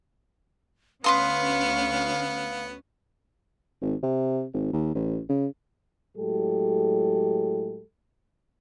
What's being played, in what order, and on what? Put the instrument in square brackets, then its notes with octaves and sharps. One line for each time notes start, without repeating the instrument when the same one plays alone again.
[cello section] D2 C#4 [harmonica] B3 [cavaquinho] B4 C6 D#6 [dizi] F5
[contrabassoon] G#1
C3
G#1
D#2
A1
C#3
[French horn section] A2 F#3 G#3 G4 A4